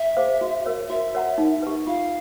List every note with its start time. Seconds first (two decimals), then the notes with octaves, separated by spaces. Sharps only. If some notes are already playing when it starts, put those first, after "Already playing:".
Already playing: E5
0.17 G#4 C5 F5
0.41 F#4
0.66 A#4 C#5
0.90 F#4 E5
1.14 A#4 C#5 F#5 A#5
1.38 D#4
1.62 G4 B4
1.87 F4 F5